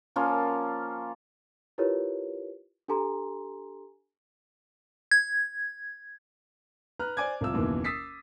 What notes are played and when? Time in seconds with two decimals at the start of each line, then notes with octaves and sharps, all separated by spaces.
0.16 F3 A#3 C#4 F4
1.78 E4 F4 G4 A#4 B4 C#5
2.88 D4 G4 A4 G#5 A#5 C6
5.11 G#6
6.99 B4 A#5 F6 F#6
7.17 C5 D5 G#5 D6 G#6
7.41 C2 F3 E6
7.54 F#1 D#2 B2 E3
7.84 D#6 E6 A6 B6 C7